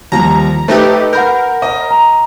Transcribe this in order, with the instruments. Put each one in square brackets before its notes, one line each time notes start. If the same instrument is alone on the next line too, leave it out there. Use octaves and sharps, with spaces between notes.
[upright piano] D#2 F3 G3 [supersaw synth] A#5
[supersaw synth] A3 D#4 G4 [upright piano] B4
[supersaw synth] A#4 [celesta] F#5 B5 G6
[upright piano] D#5
[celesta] A#5